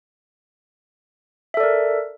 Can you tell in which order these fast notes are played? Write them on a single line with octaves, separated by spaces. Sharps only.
E5 A4 D5 A#4